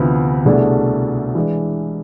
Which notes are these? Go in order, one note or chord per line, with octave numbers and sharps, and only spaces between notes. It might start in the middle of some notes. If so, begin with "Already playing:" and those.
Already playing: D2 C3 E3 B3 F4
C2 B2 A3 D4 G#4
E3 G#3 D4